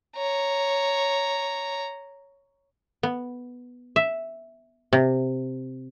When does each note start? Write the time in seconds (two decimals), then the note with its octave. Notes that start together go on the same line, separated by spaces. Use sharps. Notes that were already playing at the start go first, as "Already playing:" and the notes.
0.16 C#5 A#5
3.03 B3
3.96 E5
4.93 C3